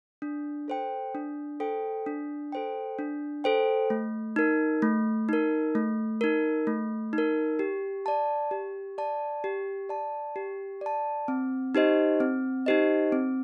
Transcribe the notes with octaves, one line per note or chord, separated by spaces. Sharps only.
D4
A4 C5 G5
D4
A4 C5 G5
D4
A4 C5 G5
D4
A4 C5 G5
A3
D#4 A#4
A3
D#4 A#4
A3
D#4 A#4
A3
D#4
A#4
G4
D5 A5
G4
D5 A5
G4
D5 A5
G4
D5 A5
C4
D#4 G4 C5 D#5
C4
D#4 G4 C5 D#5
C4